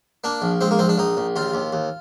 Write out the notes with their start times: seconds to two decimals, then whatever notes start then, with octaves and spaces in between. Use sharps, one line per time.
0.24 A#3 D4
0.42 A#1
0.61 G#3 C4
0.71 A#3
0.79 A#1 C4
0.89 D4
0.98 A#1 D#4
1.17 A#1
1.36 D#2 F4
1.54 D#2
1.73 D#2